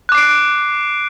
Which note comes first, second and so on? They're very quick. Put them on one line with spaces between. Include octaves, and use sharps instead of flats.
F#6 D6 C7 D7